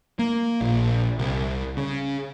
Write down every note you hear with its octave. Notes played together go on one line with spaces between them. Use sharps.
A#3
A#1
C2
C#3